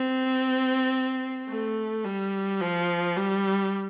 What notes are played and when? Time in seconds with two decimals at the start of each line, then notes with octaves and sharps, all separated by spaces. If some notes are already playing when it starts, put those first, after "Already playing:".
Already playing: C4
1.49 A3
2.05 G3
2.60 F3
3.16 G3